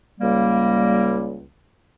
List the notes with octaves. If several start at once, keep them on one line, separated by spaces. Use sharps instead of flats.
C#2 G3 A#3